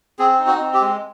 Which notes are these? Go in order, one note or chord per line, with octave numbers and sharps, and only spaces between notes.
C4 G#4
D#4
F#4
C4
G4
G#3